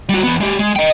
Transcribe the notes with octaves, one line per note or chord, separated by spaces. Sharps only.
G3 F#4
E2 B3
G#3 G4
G#3
D#5 G5